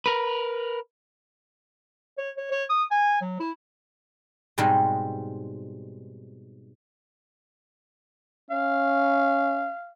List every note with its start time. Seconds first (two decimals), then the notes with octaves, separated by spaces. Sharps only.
0.06 A#4 B4
2.18 C#5
2.37 C#5
2.51 C#5
2.70 D#6
2.91 G#5
3.21 F#3
3.40 E4
4.58 G#2 B2 G3 G#3 C4 D#4
8.50 C#4 F5